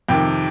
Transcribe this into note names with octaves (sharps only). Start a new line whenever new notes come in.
F2 C3 D#3 G5